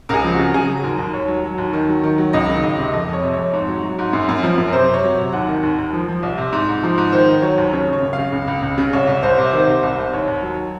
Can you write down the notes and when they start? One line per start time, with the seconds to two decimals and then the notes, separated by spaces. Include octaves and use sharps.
0.09 C#2 G#4 A#4
0.24 F3
0.34 F#4
0.39 C#3
0.47 A#4
0.54 F#3 G#4
0.69 F#3
0.84 D#2 A#4
0.99 D#2
1.13 D#2 C#5
1.28 F#3
1.44 F#3
1.58 D#2
1.73 D#3
1.89 F#3
2.04 D#3
2.18 F#3
2.33 C#2 D#5
2.48 D#3
2.63 C#2 D#5
2.78 C3
2.93 F2 D#5
3.08 F2
3.13 C#5
3.23 C3
3.33 C#5
3.38 F2
3.53 G#2
3.68 F#3
3.83 F#3
3.99 G#2
4.13 F#2
4.28 F#2
4.43 F3
4.58 F#2
4.68 A#4
4.73 C3 C5
4.88 C3
4.94 C#5
5.04 F#3
5.19 C3
5.33 D#2 F#5
5.49 D#3
5.63 D#2
5.78 D#2
5.93 F3
6.08 F3
6.23 C2
6.38 C3
6.52 G#2
6.69 G#2
6.83 F3
6.98 G#2
7.12 D#3 C5
7.29 D#3
7.42 F#3 C#5
7.58 D#2
7.73 C#3 C#5
7.88 C#3 C#5
8.02 F#2
8.13 F5
8.18 C#3
8.32 C#2
8.47 C#2
8.62 C#2
8.78 C#3
8.93 C2 C#5
9.07 C2
9.23 C2 C5
9.38 C3
9.53 D#3 C5
9.67 C3
9.83 C2
9.98 C2
10.13 D#2 C#5
10.28 D#2
10.42 F#3